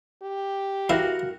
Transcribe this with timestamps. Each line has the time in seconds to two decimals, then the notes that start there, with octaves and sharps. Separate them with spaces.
0.22 G4
0.90 E4 F#4 A#4 F5